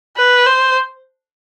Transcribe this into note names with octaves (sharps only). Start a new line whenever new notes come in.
B4
C5